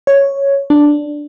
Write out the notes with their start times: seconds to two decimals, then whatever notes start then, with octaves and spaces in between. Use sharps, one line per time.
0.07 C#5
0.70 D4